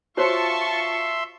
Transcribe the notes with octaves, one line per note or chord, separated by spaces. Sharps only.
F4 F#4 C5 C#5 E5 A5 C6 C#6